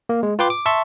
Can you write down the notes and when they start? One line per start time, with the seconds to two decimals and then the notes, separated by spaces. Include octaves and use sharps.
0.09 A#3
0.23 G#3
0.39 F4 B4 G5 C6 D6
0.50 D6
0.66 E5 A5 C6 C#6